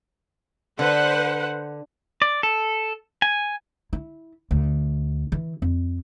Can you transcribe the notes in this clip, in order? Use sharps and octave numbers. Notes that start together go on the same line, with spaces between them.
D3 B4 C5 F#5
D5
A4
G#5
E4
D2
E3
F2